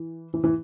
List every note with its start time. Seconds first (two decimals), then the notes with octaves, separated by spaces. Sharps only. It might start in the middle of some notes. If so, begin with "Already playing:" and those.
Already playing: E3
0.34 E3
0.44 E3